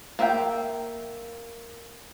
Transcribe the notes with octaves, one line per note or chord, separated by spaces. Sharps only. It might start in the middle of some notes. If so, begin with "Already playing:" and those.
A#3 E5 G5